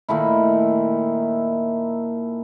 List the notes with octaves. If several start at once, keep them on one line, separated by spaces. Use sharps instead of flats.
A#2 D#3 A3 E4